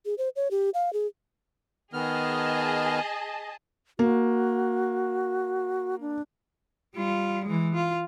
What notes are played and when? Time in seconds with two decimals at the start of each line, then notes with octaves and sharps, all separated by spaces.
0.06 G#4
0.18 C5
0.36 C#5
0.51 G4
0.74 F5
0.93 G#4
1.93 D#3 B3 G#4 D#5 A5 F6
3.99 A#3 F#4
6.01 D4
6.95 G3 F4
7.45 E3 G#3
7.74 F4